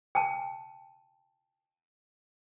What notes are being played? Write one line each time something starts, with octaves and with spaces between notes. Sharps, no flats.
G5 A5